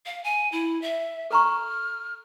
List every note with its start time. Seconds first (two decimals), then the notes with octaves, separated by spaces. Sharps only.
0.06 F5
0.24 G#5
0.52 E4
0.82 E5
1.31 A4 A#5 C#6 F6